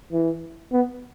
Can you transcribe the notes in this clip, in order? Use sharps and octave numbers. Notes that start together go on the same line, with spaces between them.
E3
B3